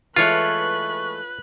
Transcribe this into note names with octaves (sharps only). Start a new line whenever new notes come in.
E3 G#3 A3 F4 B4 C#5 C#6 F#6